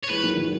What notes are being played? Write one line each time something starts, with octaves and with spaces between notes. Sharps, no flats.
C#5
E3 G#3 B4
D#3 F#3
D#3 F#3